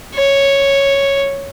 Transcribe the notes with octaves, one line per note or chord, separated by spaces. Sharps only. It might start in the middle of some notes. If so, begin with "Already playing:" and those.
C#5